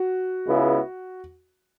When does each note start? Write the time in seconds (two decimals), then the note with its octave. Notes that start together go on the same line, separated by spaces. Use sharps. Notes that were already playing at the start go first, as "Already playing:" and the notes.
Already playing: F#4
0.47 C#2 C#3 G#3 B3 E4